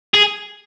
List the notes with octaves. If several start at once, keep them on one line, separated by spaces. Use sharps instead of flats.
G#4